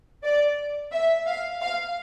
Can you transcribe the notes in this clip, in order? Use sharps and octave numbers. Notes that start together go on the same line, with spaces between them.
D5
E5
F5
F5